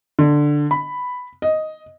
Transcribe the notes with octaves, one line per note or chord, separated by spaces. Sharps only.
D3
B5
D#5